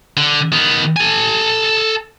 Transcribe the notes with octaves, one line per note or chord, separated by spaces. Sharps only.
D3
D#3 B3
A4 G#5